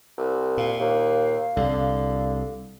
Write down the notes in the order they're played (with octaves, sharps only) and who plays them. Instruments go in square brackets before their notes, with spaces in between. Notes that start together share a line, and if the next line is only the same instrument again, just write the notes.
[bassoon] C2
[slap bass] A#2 [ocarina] F5
[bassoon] D#2
[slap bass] C2 [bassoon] D3